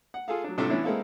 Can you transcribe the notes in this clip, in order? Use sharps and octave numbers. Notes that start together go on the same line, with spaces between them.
F#5
F4 G#4 A4 F5
F#3 D4
A2 C3 G3 D4 F4 A4
E3 B3 C#4 D4 E4
G#3 A#3 C4 E4 A4 F5